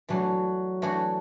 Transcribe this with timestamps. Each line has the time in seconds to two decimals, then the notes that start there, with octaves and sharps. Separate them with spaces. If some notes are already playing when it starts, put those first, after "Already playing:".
0.09 E3 F#3 A3 D4 F#4
0.82 E3 A3 D4 F#4